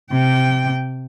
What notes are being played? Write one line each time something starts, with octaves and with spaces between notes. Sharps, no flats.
C3 G5